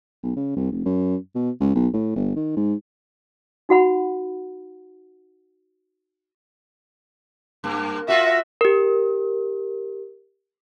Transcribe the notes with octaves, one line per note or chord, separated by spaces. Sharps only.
B1
C#3
C2
F1
F#2
B2
C#2
B1
A2
G1
D#3
G#2
D#4 F#4 F#5 B5
G2 A#3
F4 F#4 E5
G4 A#4